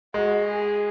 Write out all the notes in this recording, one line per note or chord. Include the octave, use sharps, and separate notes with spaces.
G#3 F#4
G#4